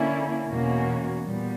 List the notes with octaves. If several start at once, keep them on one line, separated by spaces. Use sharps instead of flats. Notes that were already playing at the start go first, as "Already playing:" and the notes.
Already playing: D3 A#3 C#4 E4
E2 B2 A#3 C#4 F#4
A#2 G3 B3